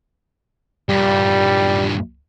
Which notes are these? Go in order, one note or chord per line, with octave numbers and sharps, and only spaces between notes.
G2 A#2 G3